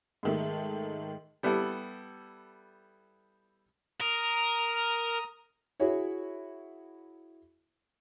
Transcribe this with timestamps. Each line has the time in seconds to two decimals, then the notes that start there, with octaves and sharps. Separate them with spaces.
0.23 G#2 D#3 A3
1.43 G3 B3 E4 A4
4.01 A#4 A#5 D#6
5.80 E4 F#4 G#4 C#5